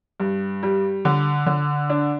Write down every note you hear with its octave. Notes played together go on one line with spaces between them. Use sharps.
G2
G3
D3
D3
D4